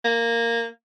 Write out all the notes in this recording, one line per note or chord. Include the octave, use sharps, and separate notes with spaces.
A#3